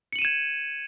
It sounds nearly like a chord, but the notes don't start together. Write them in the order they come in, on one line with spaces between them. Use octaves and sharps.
C#7 F#7 D#7 E7 G#6